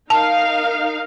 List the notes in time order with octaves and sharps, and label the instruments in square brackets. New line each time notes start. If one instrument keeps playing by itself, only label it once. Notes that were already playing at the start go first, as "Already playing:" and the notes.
[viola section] D#4 A#4 F5 [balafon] A5